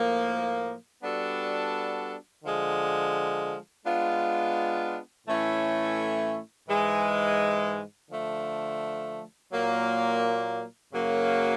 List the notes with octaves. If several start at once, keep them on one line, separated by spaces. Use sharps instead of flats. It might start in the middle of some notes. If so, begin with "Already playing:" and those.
Already playing: A2 F3 A#3
G3 B3 D4 F#4 A4
D3 F3 G#3
G#3 B3 D4 F4
A2 E3 A3 C#4 E4
G#2 E3 G#3
D3 F3 A3
A#2 F#3 A#3
F#2 C#3 F#3 A#3